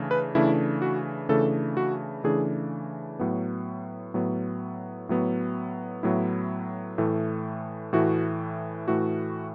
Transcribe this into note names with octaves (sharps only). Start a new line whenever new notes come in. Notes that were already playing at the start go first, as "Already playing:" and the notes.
Already playing: C#3 E3 A3 D4
B4
C#3 E3 A3 D4 E4
F#4
C#3 E3 A3 D4 A4
F#4
C#3 E3 A3 D4 G#4
A2 F#3 B3
A2 F#3 B3
A2 F#3 B3
A2 F#3 B3 E4
A2 E3 A3
A2 E3 A3 F#4
A2 E3 A3 F#4